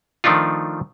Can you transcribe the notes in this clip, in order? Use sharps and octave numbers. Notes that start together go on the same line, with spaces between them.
D#3 F3 A3 D4 D#4 F4